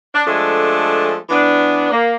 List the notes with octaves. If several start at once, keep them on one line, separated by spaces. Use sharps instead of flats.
D4
F3 G#3 A3 D4 A4
E3 B3 D4
A#3